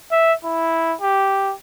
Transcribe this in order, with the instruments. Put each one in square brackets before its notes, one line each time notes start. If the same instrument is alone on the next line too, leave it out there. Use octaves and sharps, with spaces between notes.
[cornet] E5
E4
G4